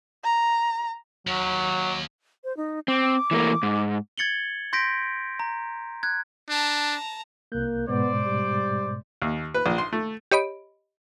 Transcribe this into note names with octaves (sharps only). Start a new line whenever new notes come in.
A#5
D#2 F#3
C5
D#4
C4 D6
E3 A3 A#3
G#2
G#6 A6 C#7 F#7 G7
C6 G6 A#6 B6 D7
A#5
F#6 G#6
D4 A5 A#5
C2 A#3 F#6 G6
G#2 B2 G#3 B3 C5 D5
G3
D#2
B4
A#1
C6
A3
G4 C#5 D#5 B5 D7